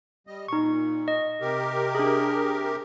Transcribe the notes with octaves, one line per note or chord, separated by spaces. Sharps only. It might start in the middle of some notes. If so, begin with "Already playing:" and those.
G3 D#5
A#2 D#4 C#6
D#5
C3 G4 A#4
D4 G#4